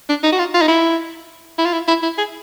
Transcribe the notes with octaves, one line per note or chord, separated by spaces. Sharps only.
D4
D#4
F#4
F4
F4
D#4
E4
E4
F4
E4
E4
E4
G#4